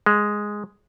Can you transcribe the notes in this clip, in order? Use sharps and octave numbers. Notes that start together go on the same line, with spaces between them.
G#3